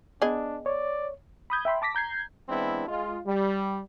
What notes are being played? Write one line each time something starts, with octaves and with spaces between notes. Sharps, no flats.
B3 D4 G#4 D#5
C#5 D5
B5 D#6 G6 G#6
E5 G5 B5 C6
A5 D6 A#6 B6
A#5 G6 G#6 C7
E3 G#3 B3 C4 D4 E4
G#3 F4
G3